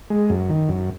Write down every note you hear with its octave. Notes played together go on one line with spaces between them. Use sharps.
G#3
F#2
D#3
F#2